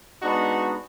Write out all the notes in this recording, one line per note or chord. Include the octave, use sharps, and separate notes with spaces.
G#3 B3 D4 D#4 F#4